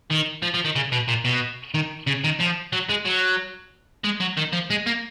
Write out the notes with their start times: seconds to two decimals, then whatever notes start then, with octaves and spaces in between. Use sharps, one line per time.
0.11 D#3
0.43 F3
0.54 F3
0.65 D#3
0.76 C#3
0.92 B2
1.08 A#2
1.25 B2
1.75 D#3
2.07 C#3
2.24 D#3
2.40 F3
2.73 F#3
2.89 G#3
3.05 F#3
4.04 G#3
4.20 F#3
4.37 D#3
4.53 F3
4.70 G#3
4.87 A#3